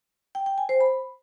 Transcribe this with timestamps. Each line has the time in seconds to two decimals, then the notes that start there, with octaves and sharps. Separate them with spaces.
0.35 G5
0.46 G5
0.58 G#5
0.69 C5
0.81 B5